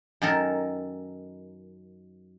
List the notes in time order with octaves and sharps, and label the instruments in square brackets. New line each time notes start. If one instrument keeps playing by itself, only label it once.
[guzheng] F#2 D#3 A4 A#4